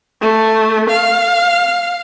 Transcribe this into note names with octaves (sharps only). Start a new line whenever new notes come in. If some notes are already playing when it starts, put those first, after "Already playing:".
A3
F5